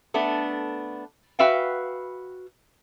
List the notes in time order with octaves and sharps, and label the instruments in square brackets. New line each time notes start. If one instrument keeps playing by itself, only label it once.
[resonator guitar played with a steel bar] A3 B3 D4
F#4 B4 E5 F5 G5